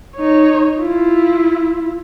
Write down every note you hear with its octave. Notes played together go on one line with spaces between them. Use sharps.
D#4 C#5
E4 F4